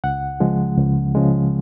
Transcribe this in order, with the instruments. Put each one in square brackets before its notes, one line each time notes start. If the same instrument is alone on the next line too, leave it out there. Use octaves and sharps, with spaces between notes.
[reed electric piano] C#2 F#5
C#3 F3 G#3
C#2
C#3 F3 G#3